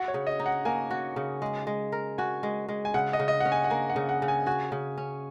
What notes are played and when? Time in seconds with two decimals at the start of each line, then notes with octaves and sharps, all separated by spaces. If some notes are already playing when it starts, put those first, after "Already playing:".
Already playing: F#4 F#5
0.08 C#5
0.14 C#3
0.27 D#5
0.39 D#4
0.46 F#5
0.65 A#3 G#5
0.91 F#4
1.16 C#3
1.42 G#3
1.67 G#3
1.92 A#4
2.18 F#4 G#5
2.43 G#3
2.69 G#3
2.85 G#5
2.94 C#3 F#5
3.13 D#5
3.20 C#3
3.28 D#5
3.40 C#4 F#5
3.52 G#5
3.64 F#5
3.70 A#3 G#5
3.90 F#5
3.96 C#3
4.09 F#5
4.22 C#3
4.28 G#5
4.46 F#4 G#5
4.72 C#3
4.97 C#4